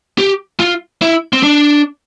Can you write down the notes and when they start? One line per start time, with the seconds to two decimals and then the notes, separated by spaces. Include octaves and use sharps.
0.18 G4
0.60 F4
1.02 E4
1.33 C4
1.43 D4